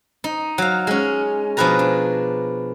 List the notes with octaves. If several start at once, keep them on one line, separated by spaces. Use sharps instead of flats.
D#4
F#3 F5
G#3 C#4
B2 F3 D4 G#4 B4 A#5
D4